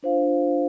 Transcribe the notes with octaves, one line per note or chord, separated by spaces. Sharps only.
D4 F4 C5 F5